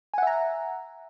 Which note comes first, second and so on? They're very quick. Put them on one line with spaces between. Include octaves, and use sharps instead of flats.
G#5 F#5 E5 A#5